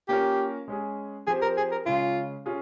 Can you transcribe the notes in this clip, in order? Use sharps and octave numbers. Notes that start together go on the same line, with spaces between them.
A#3 C#4 F4 G4 A#4
G#3 C#4 G#4
F3 C4 G4 G#4 C5
A#4
G#4
A#4
C#3 G#3 C#4 F4
C#4 F4 G#4